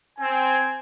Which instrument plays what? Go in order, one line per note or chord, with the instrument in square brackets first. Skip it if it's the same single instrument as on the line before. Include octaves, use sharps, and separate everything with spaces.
[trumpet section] C4 G#5